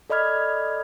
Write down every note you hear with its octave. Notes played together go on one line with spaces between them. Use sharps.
A4 D5 D#5 B5 F6 G#6